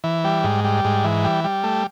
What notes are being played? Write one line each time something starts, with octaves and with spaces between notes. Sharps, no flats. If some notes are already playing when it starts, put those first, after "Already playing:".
E3
G3
G#2
G3
G#2
E3
G3
G3
A3